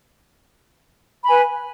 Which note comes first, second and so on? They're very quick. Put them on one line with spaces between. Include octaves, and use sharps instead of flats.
B5 G#5 B4